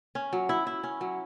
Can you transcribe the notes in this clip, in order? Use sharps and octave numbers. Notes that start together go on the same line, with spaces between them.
C#4
F#3
E4
E4
C#4
F#3